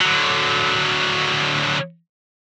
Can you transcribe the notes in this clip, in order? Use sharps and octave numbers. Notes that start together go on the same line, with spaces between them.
D3 F#3